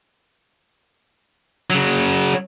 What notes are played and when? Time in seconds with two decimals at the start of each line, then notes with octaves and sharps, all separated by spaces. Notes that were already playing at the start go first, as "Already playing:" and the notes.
1.70 C#3 F#3